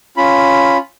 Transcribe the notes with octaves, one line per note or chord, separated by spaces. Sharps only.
C#4 F4 B5